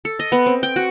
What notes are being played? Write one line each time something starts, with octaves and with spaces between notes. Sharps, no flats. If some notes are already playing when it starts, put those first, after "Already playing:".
A4
D#5
B3
C4
G5
F#4